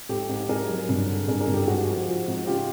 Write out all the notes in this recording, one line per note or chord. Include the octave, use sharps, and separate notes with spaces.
G#2 G4 A4
G#2
G#2 G#4 A#4
F#3
G2
D3
G2 G#4 A#4
G#4 A#4
G2
G4 A4
G#2 F#4 G#4
F3
F3
G#2
C#3 F4 G4